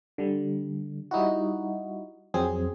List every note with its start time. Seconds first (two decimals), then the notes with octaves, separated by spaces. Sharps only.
0.18 D3 G3
1.11 G3 D#4 E4 F#4
2.34 F2 F#3 C4 G#4